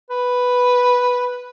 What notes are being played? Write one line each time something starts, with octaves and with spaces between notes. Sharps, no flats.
B4